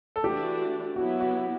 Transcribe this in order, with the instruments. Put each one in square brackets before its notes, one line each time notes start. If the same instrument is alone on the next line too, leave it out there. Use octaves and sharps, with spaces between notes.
[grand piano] A4
[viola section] E3 A3 D4 F#4 [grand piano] G4
[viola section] F#3 B3 E4 [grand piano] F#4
[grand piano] F#4